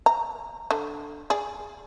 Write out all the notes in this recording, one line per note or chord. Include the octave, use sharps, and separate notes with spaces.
A#5
D3
G#4 D5